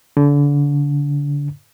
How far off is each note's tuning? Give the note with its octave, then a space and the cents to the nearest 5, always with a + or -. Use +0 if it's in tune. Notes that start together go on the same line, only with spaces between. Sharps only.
D3 -30